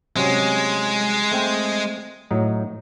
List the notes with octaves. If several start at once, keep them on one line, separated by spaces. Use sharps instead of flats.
C3 F#3 G#3 C#4
A3 C4 G5
A2 F#3 D#4